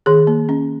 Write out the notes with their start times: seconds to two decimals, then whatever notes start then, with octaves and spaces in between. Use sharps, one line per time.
0.06 D#3 G#4
0.27 A#3
0.49 C#4